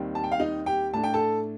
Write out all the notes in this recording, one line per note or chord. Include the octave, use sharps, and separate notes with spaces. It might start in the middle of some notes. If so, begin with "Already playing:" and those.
Already playing: D#2 D#3 G3 C4
A5
G5
F5
D#4 D#5
G4 G5
A2 A3 D4 A5
G5
A4 A5